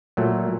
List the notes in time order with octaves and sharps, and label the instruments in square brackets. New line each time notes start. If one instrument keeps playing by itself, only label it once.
[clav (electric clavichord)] A#2 F#3 A3